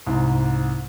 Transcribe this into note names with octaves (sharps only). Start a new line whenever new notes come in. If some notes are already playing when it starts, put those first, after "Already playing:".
C2 G#2